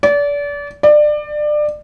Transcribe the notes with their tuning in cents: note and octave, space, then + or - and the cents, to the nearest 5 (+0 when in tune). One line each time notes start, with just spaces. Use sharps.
D5 -30
D5 +25